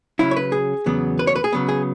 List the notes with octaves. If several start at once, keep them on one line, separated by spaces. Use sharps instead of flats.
C#3 F#3 C#4 E4
C#5
B4
G#4
E2 C#3 F#3 B3
B4
C#5
B4
G#4
C#3 F#3 B3
G#4